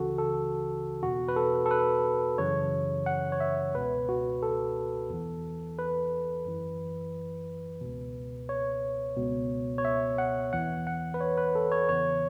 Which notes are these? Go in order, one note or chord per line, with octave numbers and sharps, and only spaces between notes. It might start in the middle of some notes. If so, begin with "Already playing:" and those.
Already playing: C#2 C#3 E3 F#4 A4
A4
E2 B2 F#4
B4
A4
A4
B4
F#2 C#3 E3 C#5
F#5
C#5
E5
C#2 B2 B4
F#4
A4
E2 E3
B4
F#2 E3
C#2 B2
C#5
C#2 B2
C#5
E5
F#5
E2 E3 F#5
F#5
B4
C#5
B4
A4
C#5
E2 C#3 E3 C#5